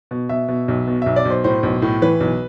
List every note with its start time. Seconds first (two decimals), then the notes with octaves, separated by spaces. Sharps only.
0.11 B2
0.29 B2 E5
0.48 B2
0.68 B1
0.87 B2
1.02 B1 E5
1.16 D5
1.25 B1 C5
1.44 A2 C5
1.63 B1
1.82 A2
2.02 E3 B4
2.20 B1